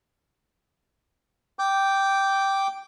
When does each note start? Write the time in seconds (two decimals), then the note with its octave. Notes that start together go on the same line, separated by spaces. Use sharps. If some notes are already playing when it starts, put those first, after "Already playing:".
1.59 G5 D6 G6